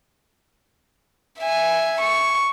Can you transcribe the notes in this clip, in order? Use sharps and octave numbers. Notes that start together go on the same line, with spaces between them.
E5 G#5
C#6